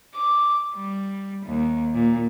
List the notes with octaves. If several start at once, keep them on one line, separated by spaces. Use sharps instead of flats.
D6
G3
D#2
A#2